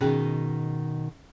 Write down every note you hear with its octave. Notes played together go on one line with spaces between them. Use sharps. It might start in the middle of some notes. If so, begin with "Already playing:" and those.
B2 D#3 C#4 G#4 G5